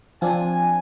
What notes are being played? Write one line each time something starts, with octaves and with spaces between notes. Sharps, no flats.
F3 C4 D4 F4 G#5